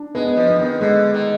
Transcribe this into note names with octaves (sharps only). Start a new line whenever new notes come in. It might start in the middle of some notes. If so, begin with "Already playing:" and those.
Already playing: D4
G#3 B3
F3
B3
D#3
D3 G#3
D#3